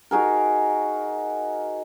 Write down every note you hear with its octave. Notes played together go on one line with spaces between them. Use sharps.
D#4 F#4 G#4 A#4